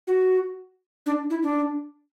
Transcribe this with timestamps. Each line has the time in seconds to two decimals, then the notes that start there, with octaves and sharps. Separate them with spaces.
0.07 F#4
1.06 D4
1.30 E4
1.43 D4